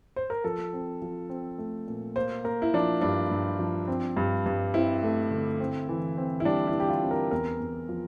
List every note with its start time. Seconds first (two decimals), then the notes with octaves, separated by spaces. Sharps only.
0.16 C5
0.30 A#4
0.44 F3 A4
0.73 C4
1.02 F3
1.30 C4
1.58 A3
1.87 A#2
2.16 A#3 C5
2.44 A#3 A#4
2.62 E4
2.74 F3 D4
3.01 G2 D4
3.31 G2
3.59 F3
3.88 C4
4.17 G2
4.46 G2
4.74 C4 E4
5.03 A3
5.31 D3
5.60 C4
5.89 E3
6.17 C4
6.40 E4
6.45 G3 D4
6.67 E4
6.74 E3
6.80 G4
6.89 F4
7.03 C4
7.11 A#4
7.31 E2 A#4
7.60 E2
7.89 F3